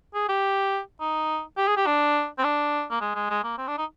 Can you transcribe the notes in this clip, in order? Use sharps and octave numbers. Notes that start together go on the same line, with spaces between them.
G#4
G4
D#4
G4
G#4
G4
D4
C4
D4
A#3
G#3
G#3
G#3
A#3
C4
D4
D#4